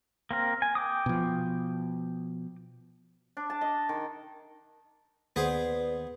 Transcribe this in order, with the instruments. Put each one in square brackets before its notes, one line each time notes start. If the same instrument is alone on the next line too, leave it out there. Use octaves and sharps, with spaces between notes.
[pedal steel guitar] A#3 C4 A#4
G#5
G5 D6 D#6
[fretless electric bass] B2 F3
[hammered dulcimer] D4
A5
D#5
D#3
[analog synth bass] D#2 [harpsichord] B3 G#4 C5 [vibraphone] B4 D5